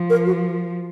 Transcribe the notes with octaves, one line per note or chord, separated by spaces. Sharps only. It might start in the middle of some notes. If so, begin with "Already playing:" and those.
Already playing: F3
A#4
F#4